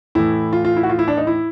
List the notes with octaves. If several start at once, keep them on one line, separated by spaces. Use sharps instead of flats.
A2 E3 E4
F4
F4
E4
F#4
F4
E4
D4
D#4
E4